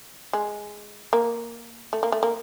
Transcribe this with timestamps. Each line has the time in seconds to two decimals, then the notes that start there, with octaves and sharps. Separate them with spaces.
0.33 G#3
1.13 A#3
1.93 A3
2.03 A#3
2.12 A3
2.23 A#3